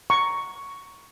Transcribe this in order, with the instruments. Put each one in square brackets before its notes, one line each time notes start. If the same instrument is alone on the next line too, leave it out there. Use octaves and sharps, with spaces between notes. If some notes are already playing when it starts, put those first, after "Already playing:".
[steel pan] A#5 C#6